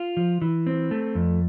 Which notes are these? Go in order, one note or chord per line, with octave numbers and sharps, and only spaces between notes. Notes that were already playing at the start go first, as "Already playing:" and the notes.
Already playing: F4
F3
E3
C4
A3
F2